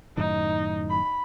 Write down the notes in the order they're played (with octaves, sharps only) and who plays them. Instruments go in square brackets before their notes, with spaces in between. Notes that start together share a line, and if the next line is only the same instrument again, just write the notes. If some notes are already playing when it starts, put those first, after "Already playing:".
[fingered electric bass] F#2 A2 D#3 [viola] D#4
[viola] B5